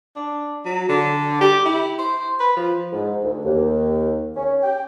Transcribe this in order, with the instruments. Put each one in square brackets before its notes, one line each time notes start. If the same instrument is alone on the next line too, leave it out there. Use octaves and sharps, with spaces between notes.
[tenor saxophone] D4
F#3
D3
G4
E4
C5
B4
F3
[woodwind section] G#2
D2
D#2
C#4
G5